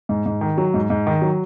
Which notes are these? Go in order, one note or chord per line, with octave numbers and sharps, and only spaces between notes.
G#2
G#2
D#3
F#3
G#2
G#2
D#3
F#3